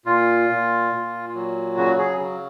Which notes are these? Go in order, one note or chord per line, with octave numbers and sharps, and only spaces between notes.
A#2 F4
A#2
A#2
F#3
C#3 F#4
G#4
C#3